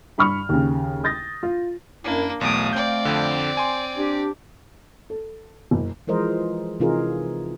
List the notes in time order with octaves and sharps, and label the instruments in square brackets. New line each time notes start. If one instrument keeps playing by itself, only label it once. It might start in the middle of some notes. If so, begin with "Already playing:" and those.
[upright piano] G2 B5 C#6 F6
D#2 C#3
D#6 G6 A6 A#6
F4
[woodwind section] F#2 E4 [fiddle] A#3 D4
[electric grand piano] B1 E2 D7 [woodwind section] A3 F5 [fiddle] D#6
[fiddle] C4 D5 [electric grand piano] G6
[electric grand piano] F2 D3
G#5 C6
[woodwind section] D4 G4
[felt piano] A4
F#1
[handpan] E3 F3 G#3 A#4 C5 D#5
C3 E3 D#4 F4 G#4 A#4